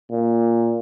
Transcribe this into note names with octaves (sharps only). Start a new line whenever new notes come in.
A#2